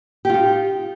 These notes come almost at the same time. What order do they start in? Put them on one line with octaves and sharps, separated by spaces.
G4 F4 D#4